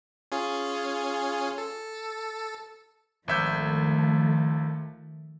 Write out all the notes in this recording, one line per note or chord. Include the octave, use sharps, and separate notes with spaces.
C#4 F4 G#4
A4
G#1 D#3 F3 A3 E5 G6